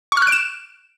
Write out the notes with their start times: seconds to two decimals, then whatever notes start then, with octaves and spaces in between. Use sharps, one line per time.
0.12 C#6
0.17 F6
0.22 F#6
0.27 D7
0.32 E7